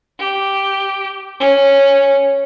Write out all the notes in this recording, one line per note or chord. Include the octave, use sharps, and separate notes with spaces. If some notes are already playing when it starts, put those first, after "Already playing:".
G4
C#4